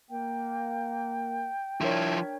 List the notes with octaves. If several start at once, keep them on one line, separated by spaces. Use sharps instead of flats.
A#3 G5
F3 D4 E4 A#4 C#5